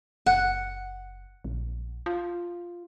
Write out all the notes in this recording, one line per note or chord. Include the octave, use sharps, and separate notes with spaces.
F#1 F#5
A#1
F4